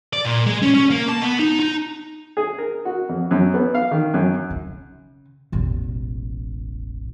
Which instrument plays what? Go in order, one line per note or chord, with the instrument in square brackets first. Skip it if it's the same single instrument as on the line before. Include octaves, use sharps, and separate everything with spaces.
[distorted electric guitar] D5
A#2
G#3
C#4
C#4
A#3
A5
B3
D#4
D#4
[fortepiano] G#4
A#4
F#4
F2
F#2
B3
F5
D#3
F#2
[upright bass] C#3
E1 A1